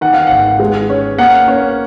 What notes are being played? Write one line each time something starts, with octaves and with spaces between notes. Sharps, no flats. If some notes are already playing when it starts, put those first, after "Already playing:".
D#3 F#5
F5
G#1 F#5
G#3
C#4
A#3 F#5
C#4